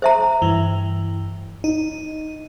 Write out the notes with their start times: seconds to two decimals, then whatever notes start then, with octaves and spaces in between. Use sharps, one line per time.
0.02 C5 E5 A#5
0.42 G2 E3
1.64 D#4